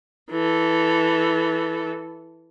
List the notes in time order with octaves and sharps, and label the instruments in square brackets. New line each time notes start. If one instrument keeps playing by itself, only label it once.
[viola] E3 A4